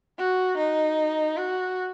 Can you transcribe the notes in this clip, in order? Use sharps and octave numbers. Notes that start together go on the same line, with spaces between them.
F#4
D#4
F#4